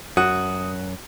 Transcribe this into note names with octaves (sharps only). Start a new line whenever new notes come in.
F#2 F#4 D#6